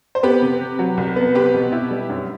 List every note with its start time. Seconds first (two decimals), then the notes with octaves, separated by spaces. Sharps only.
0.15 C5
0.23 B3 G4 B4
0.42 C3
0.61 C3
0.79 F#3
0.97 C2
1.16 B3
1.35 C4 G4 B4
1.54 B2
1.72 E4
1.91 G3
2.09 F#2